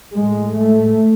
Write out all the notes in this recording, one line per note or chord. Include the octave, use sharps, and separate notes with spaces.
A2 G#3
A3